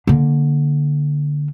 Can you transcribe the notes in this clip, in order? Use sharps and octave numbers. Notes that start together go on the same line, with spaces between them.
D3 A#3